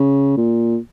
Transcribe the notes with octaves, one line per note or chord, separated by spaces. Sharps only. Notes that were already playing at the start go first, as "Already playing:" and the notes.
Already playing: C#3
A#2